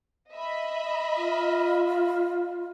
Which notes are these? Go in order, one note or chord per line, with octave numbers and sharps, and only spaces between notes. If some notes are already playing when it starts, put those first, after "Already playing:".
D#5 E5 B5
F4